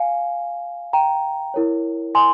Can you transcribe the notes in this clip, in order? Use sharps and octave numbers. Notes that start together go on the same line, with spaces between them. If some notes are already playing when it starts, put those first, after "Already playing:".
Already playing: F5 G#5
G5 A#5
E4 A#4 C#5
G#5 C6